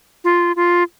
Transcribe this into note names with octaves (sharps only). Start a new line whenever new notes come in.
F4
F4